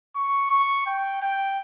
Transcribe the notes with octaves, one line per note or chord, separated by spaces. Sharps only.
C#6
C#6
G5
G5